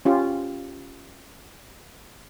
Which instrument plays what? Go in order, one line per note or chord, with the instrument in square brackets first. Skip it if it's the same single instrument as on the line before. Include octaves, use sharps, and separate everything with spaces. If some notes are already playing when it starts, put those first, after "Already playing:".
[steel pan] C#4 F4 G4